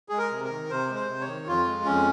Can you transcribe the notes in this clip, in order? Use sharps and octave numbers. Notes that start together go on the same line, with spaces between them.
G#3 G#4
A#4
C3
A#4
D#3
C3 C5
G#3
C5
C3
C#5
D#3
F2 F4
G#3
F2 C#4